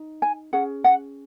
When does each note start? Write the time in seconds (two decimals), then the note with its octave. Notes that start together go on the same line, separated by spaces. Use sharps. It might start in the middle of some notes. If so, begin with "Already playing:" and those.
Already playing: D#4
0.22 G#5
0.53 C#4 G#4 F#5
0.84 F#5